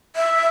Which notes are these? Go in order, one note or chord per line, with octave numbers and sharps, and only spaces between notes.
E5